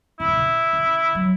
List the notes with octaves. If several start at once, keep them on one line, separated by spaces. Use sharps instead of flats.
C#3 E4
B2
C#3
C#3
F#3